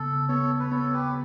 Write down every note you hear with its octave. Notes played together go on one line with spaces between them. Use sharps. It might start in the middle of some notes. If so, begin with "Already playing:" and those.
Already playing: C#3 B3 A4
B3 A4 C#5
B4
B3 A4 C#5
G4 B4